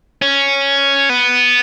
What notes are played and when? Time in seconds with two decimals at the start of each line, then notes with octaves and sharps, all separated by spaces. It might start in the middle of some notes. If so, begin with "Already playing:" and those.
0.22 C#4
1.09 B3